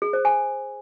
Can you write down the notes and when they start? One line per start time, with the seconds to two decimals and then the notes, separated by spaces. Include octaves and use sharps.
0.02 G#4
0.13 C5
0.25 G#5